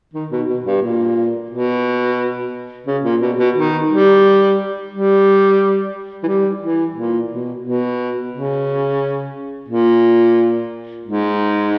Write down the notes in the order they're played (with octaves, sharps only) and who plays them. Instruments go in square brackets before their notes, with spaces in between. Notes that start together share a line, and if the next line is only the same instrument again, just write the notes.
[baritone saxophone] D#3
B2
B2
G2
A#2
B2
C#3
A#2
B2
B2
D#3
G3
G3
E3
G3
E3
A#2
B2
B2
C#3
A#2
G#2